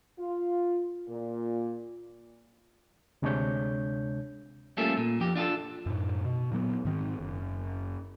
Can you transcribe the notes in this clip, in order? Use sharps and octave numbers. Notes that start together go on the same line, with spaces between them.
F4
A#2
D2 C3 G#3 D4 C#5 G6
G3 A3 A#3 C#4 F4 A4
A#2
F2 G4
D4 F4 G4 A4
F#2 A2
B2
A#2 F#3 A#3 B3
G#2 D#3 C4
F#1